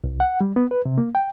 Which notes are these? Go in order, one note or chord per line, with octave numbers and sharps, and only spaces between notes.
C2
F#5
G3
B3
B4
C3
A#3
G5